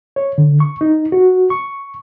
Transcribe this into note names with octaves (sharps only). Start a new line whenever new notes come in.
C#5
D3
C#6
D#4
F#4
C#6